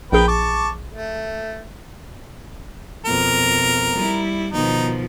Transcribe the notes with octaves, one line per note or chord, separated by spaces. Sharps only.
A#1 G#4 A#4 B4 G5
A5 C#6 D6
A3
F2 B2 A#4
G3 E4
B2 D#3 F3 D#4